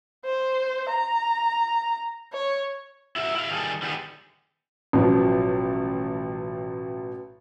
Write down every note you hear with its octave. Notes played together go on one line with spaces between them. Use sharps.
C5
A#5
C#5
E4 F#4 A#4 E5
E4 F5
D#3 G3 G#3 G#4 A4
D3 D#3 G3 B3 G4 G#4
A1 B2 F3 F#3